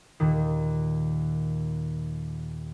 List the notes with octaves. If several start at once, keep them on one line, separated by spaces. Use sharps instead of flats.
D#2 A#2 D#3